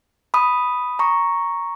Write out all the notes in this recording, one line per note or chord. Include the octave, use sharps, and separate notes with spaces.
B5 D#6
A#5 C#6